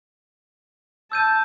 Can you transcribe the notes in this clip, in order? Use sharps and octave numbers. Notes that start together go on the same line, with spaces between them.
A5 E6 G6 D#7